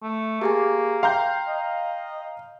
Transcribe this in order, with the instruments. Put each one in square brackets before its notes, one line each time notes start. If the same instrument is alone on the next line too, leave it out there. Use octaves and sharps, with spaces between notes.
[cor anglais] A3
[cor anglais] A#3 [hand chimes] G4 G#4 G#5
[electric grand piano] F5 A#5 G6 [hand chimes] G5 C6
[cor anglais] D#5